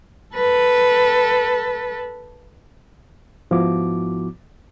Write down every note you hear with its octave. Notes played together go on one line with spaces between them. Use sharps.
A4 B4
G#2 F3 B3 E4 F#4 D6